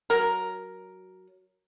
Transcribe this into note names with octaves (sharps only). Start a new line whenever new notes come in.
F#3 A#4